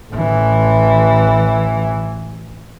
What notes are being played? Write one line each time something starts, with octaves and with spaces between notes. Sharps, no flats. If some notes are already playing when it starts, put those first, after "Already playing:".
A1 E3